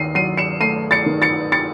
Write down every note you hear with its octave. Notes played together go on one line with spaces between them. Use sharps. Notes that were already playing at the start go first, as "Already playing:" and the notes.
Already playing: D#2 C7 D#7
F#3 C7 D#7
C#7 E7
A3 C7 D#7
A6 C#7
D#3
A6 C#7
A6 C#7